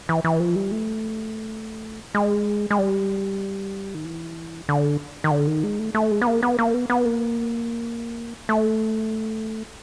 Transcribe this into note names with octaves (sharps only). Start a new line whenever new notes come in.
E3
E3
F3
G3
A3
G#3
G#3
G3
D#3
E3
D3
D#3
D3
D#3
G#3
A3
A3
G#3
B3
A#3
B3
A#3
B3
B3
A#3
A3